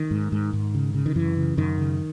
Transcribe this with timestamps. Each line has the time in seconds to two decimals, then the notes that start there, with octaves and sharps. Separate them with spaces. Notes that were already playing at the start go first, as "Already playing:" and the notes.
Already playing: D#3
0.11 G#2
0.32 G#2
0.53 G#2
0.75 C#3
0.94 C#3
1.06 D#3
1.15 F#2 E3
1.37 C#3
1.57 F#2 D#3
1.78 C#3